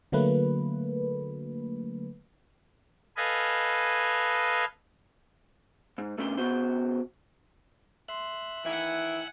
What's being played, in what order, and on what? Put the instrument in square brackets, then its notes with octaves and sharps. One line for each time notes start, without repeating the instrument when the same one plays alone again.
[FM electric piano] D3 F#3 A3 A#3 B4
[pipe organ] A4 B4 D#5 F5 G#5
[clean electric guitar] G#2
B2 A3 C#4 D4 A#4 C6
C#3 B3 F#4 C5 C6
[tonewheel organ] E5 F#6 [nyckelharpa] C6
[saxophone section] D#3 E3 E4 [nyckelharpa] F#5 G#5